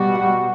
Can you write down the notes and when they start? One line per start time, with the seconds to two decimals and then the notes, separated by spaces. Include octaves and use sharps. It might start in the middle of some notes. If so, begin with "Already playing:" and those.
Already playing: B2 G3 F#4
0.15 F#5